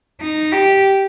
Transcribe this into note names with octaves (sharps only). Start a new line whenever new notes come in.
D#4
G4